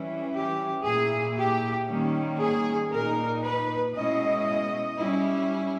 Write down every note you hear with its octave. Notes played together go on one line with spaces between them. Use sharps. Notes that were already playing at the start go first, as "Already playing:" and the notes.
Already playing: E3 G3 C#4 E4
G4
A#2 A#3 E4 G#4
G4
D#3 G3 A#3 C#4
G#4
A#2 A#3 D#4 A#4
B4
B2 G#3 C#4 E4 D#5
G3 C#4 E4